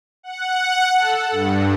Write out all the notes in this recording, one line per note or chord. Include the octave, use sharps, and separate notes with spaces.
F#5
A4
G2